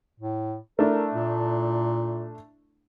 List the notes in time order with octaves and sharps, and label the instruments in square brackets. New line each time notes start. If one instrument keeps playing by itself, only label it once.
[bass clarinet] A2
[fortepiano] A3 D4 E4 [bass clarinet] A#4
[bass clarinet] A#2